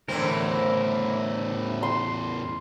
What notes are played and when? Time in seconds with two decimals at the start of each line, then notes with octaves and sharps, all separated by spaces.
0.08 E2 A2 D3 E3 A3 C4 A#4
1.83 C6